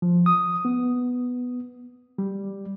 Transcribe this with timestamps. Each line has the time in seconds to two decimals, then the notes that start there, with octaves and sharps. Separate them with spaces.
0.02 F3
0.26 D#6
0.65 B3
2.18 G3